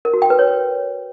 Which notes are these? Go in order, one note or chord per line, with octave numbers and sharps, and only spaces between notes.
A#4
F#4
G5
B4
C#5